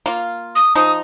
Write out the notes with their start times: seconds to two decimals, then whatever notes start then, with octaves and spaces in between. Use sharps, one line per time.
0.06 A#3 F4
0.55 D#6
0.75 F3 D#4 D#6